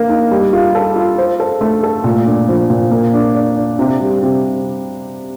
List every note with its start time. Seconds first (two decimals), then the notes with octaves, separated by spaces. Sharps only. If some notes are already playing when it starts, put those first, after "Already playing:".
Already playing: A#3
0.09 D#4
0.31 G3
0.53 F4
0.75 A4
0.96 F4
1.18 C5
1.40 A4
1.61 A3
1.83 A4
2.04 A#2
2.26 D4
2.48 F3
2.70 A#2
2.91 A#3
3.14 D4
3.35 D5
3.57 D4
3.79 C3
4.01 G3
4.22 C3